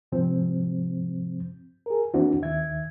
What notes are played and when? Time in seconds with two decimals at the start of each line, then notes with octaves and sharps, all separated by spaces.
0.12 G#2 C3 F3 C4
1.86 G#4 A#4
2.14 E3 A#3 C4 D4 E4 F#4
2.42 D#2 D#3 E5 G#6